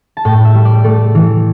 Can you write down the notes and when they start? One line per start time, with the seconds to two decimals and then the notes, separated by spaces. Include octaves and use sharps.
0.17 A5
0.25 A2 G5
0.45 E5
0.54 G3
0.65 D5
0.84 A3 A4
1.15 E3